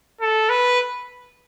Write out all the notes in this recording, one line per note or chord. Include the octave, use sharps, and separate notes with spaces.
A4
B4